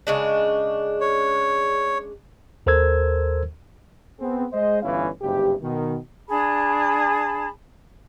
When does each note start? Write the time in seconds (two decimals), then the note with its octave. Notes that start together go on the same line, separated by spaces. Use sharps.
0.07 C#3 G#3 D4
1.01 C#5
2.66 D#2 A4 A#4 C5 E6 G#6
4.20 B3 C4 G#4
4.53 G#3 C5 D#5
4.83 G1 E3 C#4 E4 F5
5.22 F#1 G2 C3 G4
5.62 B2 D#3
6.28 D4 G#4 A5 B5